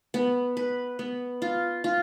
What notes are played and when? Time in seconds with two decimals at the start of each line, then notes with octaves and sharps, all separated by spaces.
0.14 B3
0.57 B4
0.99 B3
1.42 F4
1.84 F4